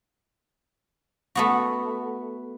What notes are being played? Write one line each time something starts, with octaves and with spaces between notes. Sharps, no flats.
A3 B3 F#4